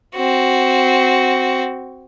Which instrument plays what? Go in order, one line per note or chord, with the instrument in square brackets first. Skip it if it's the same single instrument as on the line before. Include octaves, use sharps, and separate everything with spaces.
[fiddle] C4 F#4